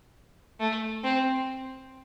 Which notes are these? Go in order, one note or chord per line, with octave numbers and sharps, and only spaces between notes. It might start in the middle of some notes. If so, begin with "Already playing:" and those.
A3
C4